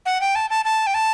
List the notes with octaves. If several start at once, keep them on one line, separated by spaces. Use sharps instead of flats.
F#5
G5
A5
A5
A5
G5
A5